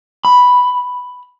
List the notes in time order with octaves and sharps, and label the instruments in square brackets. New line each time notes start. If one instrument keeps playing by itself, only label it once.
[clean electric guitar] B5